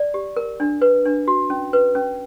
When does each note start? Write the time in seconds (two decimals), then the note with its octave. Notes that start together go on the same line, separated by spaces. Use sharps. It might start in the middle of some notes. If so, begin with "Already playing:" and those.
Already playing: D5
0.14 G4
0.37 A#4
0.60 D4
0.82 B4
1.05 D4
1.28 F#4
1.50 C#4
1.73 B4
1.95 C#4